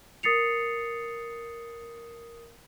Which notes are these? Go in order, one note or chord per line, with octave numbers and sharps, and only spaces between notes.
A#4 D#6 A6 C7 C#7 F7